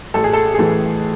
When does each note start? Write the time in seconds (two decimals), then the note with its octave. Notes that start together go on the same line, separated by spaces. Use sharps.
0.14 A1 A4
0.24 G#4
0.33 A4
0.54 G#4
0.59 A2 E3 A4